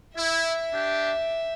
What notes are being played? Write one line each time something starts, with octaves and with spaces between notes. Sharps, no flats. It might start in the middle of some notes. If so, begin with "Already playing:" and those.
E4 E5
D4 G4